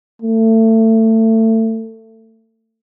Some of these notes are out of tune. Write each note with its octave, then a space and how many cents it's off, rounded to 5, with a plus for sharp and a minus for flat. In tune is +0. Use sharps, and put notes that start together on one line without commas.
A3 +25